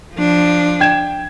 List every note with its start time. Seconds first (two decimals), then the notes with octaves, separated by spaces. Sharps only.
0.14 F3 D4
0.80 G5 G#6 E7